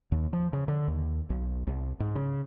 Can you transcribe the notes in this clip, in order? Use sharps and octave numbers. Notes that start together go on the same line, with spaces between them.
D#2
F3
C#3
D3
D#2
B1
C2
G#2
C#3